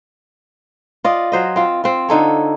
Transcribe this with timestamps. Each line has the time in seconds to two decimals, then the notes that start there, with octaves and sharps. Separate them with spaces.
1.04 F4 D5 D#5
1.32 F#3 C5 D#5
1.56 C4 F4
1.84 C4 F4
2.09 D3 D#4 A4 C#5